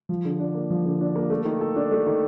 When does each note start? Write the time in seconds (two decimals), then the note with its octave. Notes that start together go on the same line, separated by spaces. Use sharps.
0.09 F3
0.25 D3
0.39 D4
0.55 A#3
0.70 F3
0.85 D3
1.01 D4
1.16 A#3
1.30 A3
1.45 D#3
1.61 A4
1.76 D4
1.91 A3
2.06 D#3